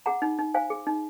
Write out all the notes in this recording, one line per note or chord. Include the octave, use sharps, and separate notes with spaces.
G#4 F#5 A#5
D#4
D#4
C5 F5 G#5
G#4
D#4